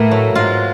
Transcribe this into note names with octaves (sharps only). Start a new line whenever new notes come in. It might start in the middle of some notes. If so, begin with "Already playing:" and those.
Already playing: A2 A3 A#3 E4 B4
F#3
G#2 G#3 F4